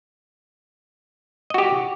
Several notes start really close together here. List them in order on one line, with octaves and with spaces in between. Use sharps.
D#5 F#4 G4